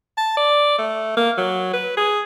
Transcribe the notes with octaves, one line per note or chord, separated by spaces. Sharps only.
A5
D5
A3
A#3
F#3
B4
G#4